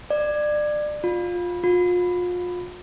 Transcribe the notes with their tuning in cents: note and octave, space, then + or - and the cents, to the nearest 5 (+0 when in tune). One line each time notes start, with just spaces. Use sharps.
D5 +25
F4 +15
F4 +35